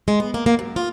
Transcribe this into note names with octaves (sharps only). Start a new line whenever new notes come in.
G#3
B3
A#3
A#3
F#2
F4